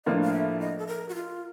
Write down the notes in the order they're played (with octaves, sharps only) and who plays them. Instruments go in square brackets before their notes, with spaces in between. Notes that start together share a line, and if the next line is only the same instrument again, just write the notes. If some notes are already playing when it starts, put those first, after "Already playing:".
[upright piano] A2 F3 A#3 D4 F4 [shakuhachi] D#5
[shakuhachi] F5
E5
D#5
A4
A#4
F#4
F4